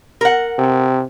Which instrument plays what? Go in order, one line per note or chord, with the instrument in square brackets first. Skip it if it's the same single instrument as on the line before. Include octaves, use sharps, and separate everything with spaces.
[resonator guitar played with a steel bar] A#4 F#5
[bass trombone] C3